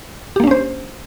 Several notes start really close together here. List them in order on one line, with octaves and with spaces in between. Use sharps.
G4 A#3 D4 C#4 C5